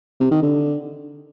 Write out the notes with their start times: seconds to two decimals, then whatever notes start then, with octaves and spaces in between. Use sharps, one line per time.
0.20 C3
0.31 D#3
0.42 D3